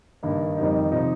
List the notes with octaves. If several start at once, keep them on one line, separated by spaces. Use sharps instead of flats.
G2 D#3 A#3 D#4
F2 D#3 G3 D#4
C3 F3 D#4